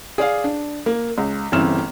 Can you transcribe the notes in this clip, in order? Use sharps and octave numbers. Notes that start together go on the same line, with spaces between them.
G#4 D5 F5
D4
A#3
C#2
G1 C#3 E3 C4 F6 E7